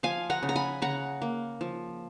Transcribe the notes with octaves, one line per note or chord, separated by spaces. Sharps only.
F3 F5 G#5
F#5 A#5
C#3
A#5
G#5 B5
C#3 F#5 A#5
A#3
F3